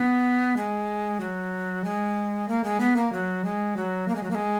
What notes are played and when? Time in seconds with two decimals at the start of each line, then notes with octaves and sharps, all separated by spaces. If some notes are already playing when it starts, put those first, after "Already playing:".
Already playing: B3
0.57 G#3
1.20 F#3
1.84 G#3
2.49 A#3
2.64 G#3
2.80 B3
2.96 A#3
3.12 F#3
3.44 G#3
3.77 F#3
4.08 A#3
4.16 G#3
4.23 F#3
4.31 A#3
4.35 G#3